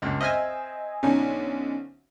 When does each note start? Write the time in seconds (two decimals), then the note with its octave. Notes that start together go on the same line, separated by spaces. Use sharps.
0.02 C#2 G2 A#2
0.21 C4 D#5 E5 G#5 F6
1.03 B1 D3 C#4 D#4 G#5